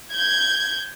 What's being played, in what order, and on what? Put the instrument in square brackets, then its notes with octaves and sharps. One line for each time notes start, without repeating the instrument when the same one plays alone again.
[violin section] G6 G#6